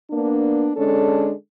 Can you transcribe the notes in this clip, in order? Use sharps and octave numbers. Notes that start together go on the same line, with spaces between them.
A#3 B3 D4
D3 G#3 C#4 D4 A4